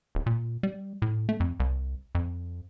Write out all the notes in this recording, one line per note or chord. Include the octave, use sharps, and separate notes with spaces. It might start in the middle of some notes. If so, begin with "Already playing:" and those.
D1
A#2
G3
A2
A3
F2
C2
F2